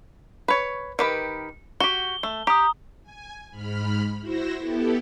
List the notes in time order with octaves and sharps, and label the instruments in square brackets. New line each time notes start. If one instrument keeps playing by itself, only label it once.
[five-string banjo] B4 C#5
D#3 G4 B4
[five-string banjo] F#4 G4 [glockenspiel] G7
[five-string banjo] A3
[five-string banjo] G4 [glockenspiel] A#5 D#6
[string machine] G#5
G#2 B5 F6
E4 F#4 C5 E6 A#6
B3 E4 G4 A4